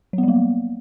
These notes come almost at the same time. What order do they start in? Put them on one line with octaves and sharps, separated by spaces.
F#3 B3 G3 A#3